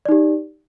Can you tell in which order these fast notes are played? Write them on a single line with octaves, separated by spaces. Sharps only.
D5 D#4 G4